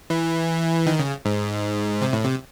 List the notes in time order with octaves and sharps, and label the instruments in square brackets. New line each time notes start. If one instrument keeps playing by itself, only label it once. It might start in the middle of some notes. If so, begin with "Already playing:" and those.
[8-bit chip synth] E3
D#3
C#3
G#2
C3
A2
C3